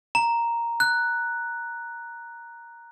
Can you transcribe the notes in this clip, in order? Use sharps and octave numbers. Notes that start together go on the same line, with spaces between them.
A#5
F#6